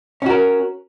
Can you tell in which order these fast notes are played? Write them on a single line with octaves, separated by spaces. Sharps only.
C#4 F#4 A#4